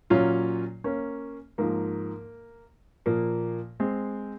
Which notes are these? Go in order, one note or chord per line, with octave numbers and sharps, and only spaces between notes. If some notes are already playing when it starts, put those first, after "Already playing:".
A#2 F#3 C#4 F4
A#3 C#4
G#2 F3 A#3
A#2 F3 A#3
G#3 C4